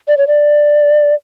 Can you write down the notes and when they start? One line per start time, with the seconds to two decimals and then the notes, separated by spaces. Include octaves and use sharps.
0.08 D5
0.17 C#5
0.27 D5